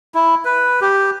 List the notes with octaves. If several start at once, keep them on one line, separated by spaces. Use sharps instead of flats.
E4
B4
G4